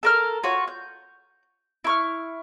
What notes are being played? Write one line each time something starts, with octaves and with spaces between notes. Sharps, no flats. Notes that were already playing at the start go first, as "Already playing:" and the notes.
A4 A#4 F6
F4 F#4 C#5
G6
E4 C#6 F6